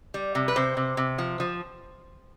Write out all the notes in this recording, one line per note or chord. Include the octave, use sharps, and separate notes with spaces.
G3
C3
B4
C3 C5
C3
C3
F3
F3